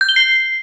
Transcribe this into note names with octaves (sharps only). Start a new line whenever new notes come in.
G6
G7
C7